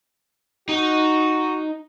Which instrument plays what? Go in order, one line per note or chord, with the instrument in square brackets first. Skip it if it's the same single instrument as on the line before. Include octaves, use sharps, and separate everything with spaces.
[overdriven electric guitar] D#4 [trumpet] F#4